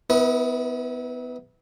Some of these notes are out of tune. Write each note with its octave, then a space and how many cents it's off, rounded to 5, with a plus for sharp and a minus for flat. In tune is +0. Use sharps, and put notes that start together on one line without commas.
B3 +15 E4 -30 B4 -40